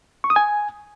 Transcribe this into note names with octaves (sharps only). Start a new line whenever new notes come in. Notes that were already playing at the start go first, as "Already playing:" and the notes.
C#6
D#6
G#5